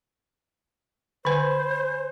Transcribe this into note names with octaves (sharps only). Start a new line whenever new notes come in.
D3 B4 C5 G#5 B5